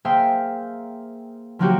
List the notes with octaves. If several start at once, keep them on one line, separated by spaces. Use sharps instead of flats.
A#3 G#4 C5 E5 F5 G5
F3 F#3 A#3 C4 F#4 G4